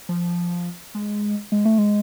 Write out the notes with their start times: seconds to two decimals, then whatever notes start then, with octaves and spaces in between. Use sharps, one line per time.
0.09 F3
0.95 G#3
1.52 G#3
1.65 A3
1.78 G#3